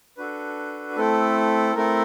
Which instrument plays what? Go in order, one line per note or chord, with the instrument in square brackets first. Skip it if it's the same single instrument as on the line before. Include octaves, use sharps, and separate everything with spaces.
[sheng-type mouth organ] D4 F#4 A4 B4
A3 C4 E4 A4
A3 C4 E4 A4 A#4